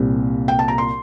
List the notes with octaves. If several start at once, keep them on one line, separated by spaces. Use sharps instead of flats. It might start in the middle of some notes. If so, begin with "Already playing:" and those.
Already playing: C2 A#2 G3 C4
G5
A5
A#5
C6